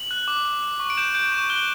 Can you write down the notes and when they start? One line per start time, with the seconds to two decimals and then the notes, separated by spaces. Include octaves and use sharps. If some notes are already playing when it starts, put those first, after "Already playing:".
Already playing: F#7
0.11 F#6
0.28 D6
0.45 D6
0.63 D6
0.80 C#6
0.90 D7
0.97 G6 E7
1.15 G6 D7
1.32 C#6 E7
1.50 F#6 G7